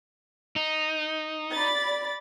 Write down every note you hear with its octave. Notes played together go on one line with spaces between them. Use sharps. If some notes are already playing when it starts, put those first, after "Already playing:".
D#4
D5 B5 A6